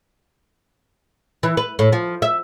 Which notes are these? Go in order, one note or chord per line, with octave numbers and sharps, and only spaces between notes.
E3
B4
A2
F3
E5